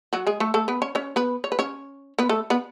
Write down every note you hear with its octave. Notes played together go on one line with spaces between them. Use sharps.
F#3 F#4
G#3 G#4
A3 A4
A3 A4
B3 B4
C#4 C#5
C#4 C#5
B3 B4
C#5
B4
C#4 C#5
B3 B4
A3 A4
B3 B4